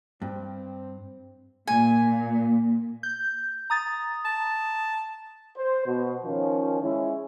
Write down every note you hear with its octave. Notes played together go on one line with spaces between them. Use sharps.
G2 C4
A#2 G#5
G6
A#5 D#6 A6
A5
C5
B2
D#3 F3 C#4
G#3 C#4 E4